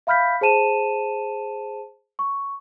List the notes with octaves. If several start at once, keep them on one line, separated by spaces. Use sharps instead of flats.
E5 F5 B5 F6 G6 B6
G#4 C5 A5 D#7 E7
C#6